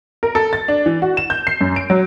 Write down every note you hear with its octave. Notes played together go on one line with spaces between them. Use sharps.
A#4
A4
A6
D4
E3
F#4
E7
G6
C7
F#2
D7
F#3